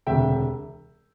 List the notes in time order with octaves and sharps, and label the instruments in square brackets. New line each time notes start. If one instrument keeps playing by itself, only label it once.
[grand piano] E1 D2 C3 E5 G5